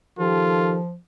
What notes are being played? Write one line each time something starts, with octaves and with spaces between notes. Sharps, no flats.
D#3 F3 F4 G4 A4